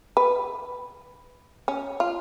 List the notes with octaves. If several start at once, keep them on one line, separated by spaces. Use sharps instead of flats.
B4
C#4
F4